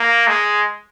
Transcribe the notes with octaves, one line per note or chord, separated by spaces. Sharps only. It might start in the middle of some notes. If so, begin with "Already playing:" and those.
Already playing: A#3
G#3